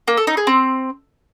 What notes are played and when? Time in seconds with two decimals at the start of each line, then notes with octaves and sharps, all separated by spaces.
0.07 A#3
0.17 A4
0.27 D#4
0.37 G#4
0.47 C4